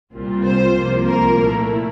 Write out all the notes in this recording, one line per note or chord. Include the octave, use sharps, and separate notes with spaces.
C2 A#2 G3 C4 F4
C5
C2 C3 F3 A#3 F4
A#4
A#2 A3 E4